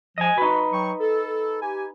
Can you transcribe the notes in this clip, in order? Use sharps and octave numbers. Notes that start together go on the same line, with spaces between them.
F3 D#5 G#5
D#4 F#4 B4
F#3 G5 C#6
A4
G4 G#5